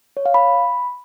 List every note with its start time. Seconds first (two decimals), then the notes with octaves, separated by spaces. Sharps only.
0.17 C#5
0.26 F5
0.34 B5